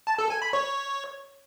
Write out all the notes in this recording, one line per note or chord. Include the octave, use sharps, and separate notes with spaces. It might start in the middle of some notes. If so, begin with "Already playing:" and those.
A5
A4
G#5
B5
C#5